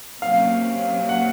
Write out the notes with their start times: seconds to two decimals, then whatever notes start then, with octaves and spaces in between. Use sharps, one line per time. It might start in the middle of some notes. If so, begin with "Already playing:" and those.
0.22 C3 F#3 A#3 C#4 F5
1.09 F#5